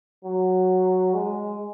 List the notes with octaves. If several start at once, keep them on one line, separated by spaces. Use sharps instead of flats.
F#3
G#3